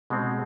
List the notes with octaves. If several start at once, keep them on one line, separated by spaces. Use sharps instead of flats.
B2 G#3 C4